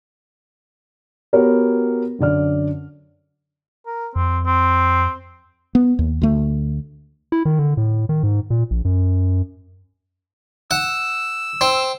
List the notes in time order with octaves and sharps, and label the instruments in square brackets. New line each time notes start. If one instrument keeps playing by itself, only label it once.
[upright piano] B3 F#4 G4 A#4 C#5
F#2 D3 D5 F6
[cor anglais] A#4
[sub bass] F2 [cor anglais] C4
[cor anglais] C4
[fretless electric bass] B3
D#2
D2 A3
[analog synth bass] E4
D#3
D3
A2
D#3
G#2
A#2
A#1
F#2
[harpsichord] F#5 [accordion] E6
[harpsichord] C4